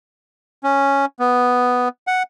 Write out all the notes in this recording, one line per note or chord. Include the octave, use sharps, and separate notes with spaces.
C#4
B3
F#5